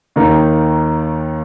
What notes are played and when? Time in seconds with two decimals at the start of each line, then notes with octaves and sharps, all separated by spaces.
0.16 D#2 D#3 A#3 D#4